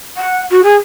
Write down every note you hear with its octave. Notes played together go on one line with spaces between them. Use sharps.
F#5
F#4
G#4